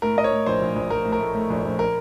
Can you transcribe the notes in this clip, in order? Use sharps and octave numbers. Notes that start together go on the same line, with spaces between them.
A2 A#4
A2 D#5
C#5
A2
A#1 C5
A#1
A#1
A#1 A#4
A2
A#4
A3
A3
A#1
A#1
A#4